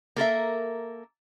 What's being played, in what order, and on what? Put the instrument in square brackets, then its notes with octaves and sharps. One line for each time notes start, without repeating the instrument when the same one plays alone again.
[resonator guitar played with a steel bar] A#3 A4 A#4 E5